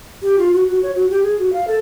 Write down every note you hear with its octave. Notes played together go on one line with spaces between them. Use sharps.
G4
F4
F#4
F#4
C#5
F#4
G4
G#4
F#4
F5
A4